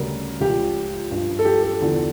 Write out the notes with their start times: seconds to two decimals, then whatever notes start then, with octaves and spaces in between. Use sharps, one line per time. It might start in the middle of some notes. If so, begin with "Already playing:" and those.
Already playing: D2 C#3 G3 A#4
0.40 C#2 C#3 F3 G4
1.11 G2 F3
1.39 A4
1.45 G4
1.63 A4
1.81 E2 D3 F3